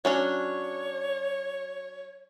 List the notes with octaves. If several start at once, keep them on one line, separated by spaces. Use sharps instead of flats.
F#3 C#4 D4 C#5